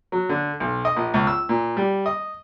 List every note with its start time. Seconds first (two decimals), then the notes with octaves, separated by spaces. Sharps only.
0.12 F#3
0.29 D3
0.60 B1
0.85 D#5
0.96 A#1
1.14 C#2
1.27 E6
1.49 A#2
1.77 G3
2.06 D#5